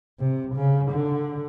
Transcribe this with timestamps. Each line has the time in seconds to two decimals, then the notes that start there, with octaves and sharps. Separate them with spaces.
0.19 C3
0.55 C#3
0.91 D3